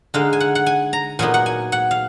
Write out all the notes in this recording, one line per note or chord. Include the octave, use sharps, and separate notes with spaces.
D3 G#3 D#4 F5
G#5
F#5
F#5
G#5
A#5
A#2 F#3 B3 D#4 G#5
F#5
G#5
F#5
F5